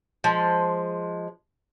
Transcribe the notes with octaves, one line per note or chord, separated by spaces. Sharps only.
F3 G#3